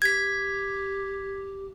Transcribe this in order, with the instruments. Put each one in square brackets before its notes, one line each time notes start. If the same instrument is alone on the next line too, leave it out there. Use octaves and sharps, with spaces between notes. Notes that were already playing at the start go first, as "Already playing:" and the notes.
[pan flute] G4 [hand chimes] G#6 B6